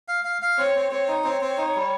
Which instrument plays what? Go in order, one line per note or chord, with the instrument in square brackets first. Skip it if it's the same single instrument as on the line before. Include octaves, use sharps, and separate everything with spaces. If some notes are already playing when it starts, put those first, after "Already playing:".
[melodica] F5
F5
F5
[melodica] C4 [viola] C#5
[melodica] C4
[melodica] C4 [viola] C#5
[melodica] D#4
[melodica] C4 [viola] C#5
[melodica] C4
D#4
G3